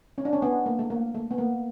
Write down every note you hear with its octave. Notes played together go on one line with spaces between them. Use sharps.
C#4
D4
C#4
B3
A#3
A3
A#3
A3
B3
A#3